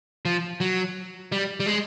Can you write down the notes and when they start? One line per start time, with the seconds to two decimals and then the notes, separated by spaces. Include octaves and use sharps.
0.25 F3
0.60 F#3
1.32 G3
1.60 G3
1.66 G#3